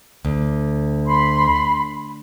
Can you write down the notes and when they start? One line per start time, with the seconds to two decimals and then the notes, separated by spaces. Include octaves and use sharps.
0.25 D2
1.07 B5 C6